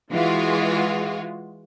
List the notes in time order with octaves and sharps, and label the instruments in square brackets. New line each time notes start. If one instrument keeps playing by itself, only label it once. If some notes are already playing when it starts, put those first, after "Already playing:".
[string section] E3 G#3 F4 F#4